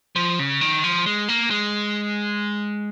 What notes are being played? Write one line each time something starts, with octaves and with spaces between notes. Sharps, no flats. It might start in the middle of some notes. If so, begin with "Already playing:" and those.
F3
C#3
D#3
F3
G#3
A#3
G#3